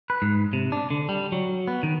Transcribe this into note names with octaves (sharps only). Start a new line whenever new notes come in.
B4
G#2
C3
D4
D3
G3
F#3
B3
D#3